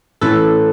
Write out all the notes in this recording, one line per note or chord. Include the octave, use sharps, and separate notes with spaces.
A2 E3 A3 C#4 A4 B4